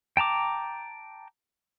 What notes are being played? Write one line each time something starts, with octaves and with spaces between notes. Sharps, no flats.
G5 A5 A#5 D6